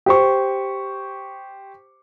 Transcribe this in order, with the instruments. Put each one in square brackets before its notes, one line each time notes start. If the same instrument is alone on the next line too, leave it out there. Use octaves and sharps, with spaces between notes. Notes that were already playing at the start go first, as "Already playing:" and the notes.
[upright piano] G4 C5 C#6